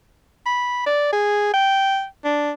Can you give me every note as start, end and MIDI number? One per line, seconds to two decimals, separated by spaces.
0.46 0.82 83
0.86 1.08 74
1.13 1.53 68
1.53 2.05 79
2.24 2.51 62